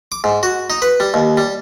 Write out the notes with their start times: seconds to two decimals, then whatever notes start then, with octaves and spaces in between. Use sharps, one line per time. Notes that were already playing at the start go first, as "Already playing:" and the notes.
0.12 D6
0.24 G#2
0.43 F#4
0.70 D#4
0.82 B4
1.00 G3
1.14 D#2
1.37 G3